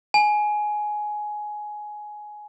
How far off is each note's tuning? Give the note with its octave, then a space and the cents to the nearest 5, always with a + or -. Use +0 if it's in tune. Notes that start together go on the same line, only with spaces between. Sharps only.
G#5 +15